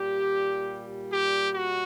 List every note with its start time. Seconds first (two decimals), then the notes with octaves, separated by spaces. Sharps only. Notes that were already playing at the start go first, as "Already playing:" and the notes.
Already playing: A#2 G3 G4
1.10 G4
1.52 F#4